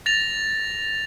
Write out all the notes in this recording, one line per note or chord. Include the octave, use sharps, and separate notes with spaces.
A6 A#6 F7